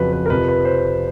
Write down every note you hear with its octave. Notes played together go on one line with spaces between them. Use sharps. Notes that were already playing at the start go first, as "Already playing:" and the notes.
Already playing: F2 C#3 F#3 B4
B4
A#4
F2 C3 F3 B4
B4
C5